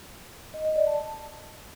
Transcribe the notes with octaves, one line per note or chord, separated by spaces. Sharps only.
D#5
D#5
D5
A5